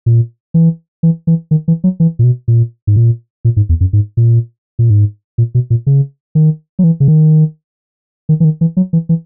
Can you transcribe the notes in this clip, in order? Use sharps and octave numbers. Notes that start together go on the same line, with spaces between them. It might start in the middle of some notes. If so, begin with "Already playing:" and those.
A#2
E3
E3
E3
D#3
E3
F#3
E3
A#2
B2
A#2
G#2
A#2
A#2
G#2
E2
F#2
G#2
A#2
A#2
G#2
A#2
B2
A#2
C#3
D#3
F#3
E3
C#3
D#3
D#3
E3
D#3
E3
F#3
E3
E3